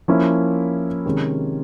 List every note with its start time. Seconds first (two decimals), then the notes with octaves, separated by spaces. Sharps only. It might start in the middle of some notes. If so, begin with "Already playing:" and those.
0.08 F3 A#3 C#4 E4
1.05 C3 D#3 G#3 C#4